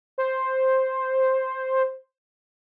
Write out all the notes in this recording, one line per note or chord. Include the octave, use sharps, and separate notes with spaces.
C5